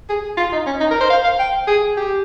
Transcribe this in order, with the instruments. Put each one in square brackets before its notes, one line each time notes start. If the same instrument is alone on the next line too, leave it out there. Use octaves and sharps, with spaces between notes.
[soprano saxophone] G#4
F4
D#4
C#4
D#4
A#4
C5
F5
F5
G5
G#4
G4